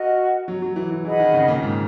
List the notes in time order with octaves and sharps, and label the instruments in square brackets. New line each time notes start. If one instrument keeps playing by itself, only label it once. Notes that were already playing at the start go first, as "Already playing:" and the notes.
Already playing: [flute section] F#4 A#4 D#5
[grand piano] F#3
F#3
E3
E3
[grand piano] E3 [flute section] G#4 D#5 F#5 B5
[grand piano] D#3
C#3
A#2
G#2